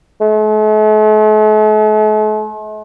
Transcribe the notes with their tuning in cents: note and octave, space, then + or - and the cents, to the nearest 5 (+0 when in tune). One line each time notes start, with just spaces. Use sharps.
A3 -45